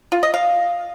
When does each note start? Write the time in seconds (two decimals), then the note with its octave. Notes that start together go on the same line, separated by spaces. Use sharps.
0.12 F4
0.23 D#5
0.34 F5